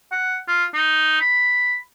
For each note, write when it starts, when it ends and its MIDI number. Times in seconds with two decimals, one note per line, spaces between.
0.12 0.37 78
0.48 0.64 65
0.74 1.20 63
1.21 1.76 83